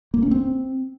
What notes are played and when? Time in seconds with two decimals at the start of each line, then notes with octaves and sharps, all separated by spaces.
0.14 A#3
0.22 C#4
0.31 C4